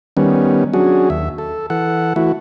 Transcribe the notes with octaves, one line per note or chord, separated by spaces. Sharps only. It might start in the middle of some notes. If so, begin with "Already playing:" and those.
D#3 G3 B3 C#4
F#3 C#4 D4 F#4 G#4
D#2 E5
A4
E3 A4 F#5
E3 A3 E4 F#4